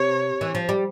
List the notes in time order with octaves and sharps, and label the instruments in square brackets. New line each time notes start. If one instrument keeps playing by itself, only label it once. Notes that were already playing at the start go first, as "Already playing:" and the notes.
Already playing: [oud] C3 [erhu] C#5
[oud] E3
F3
G3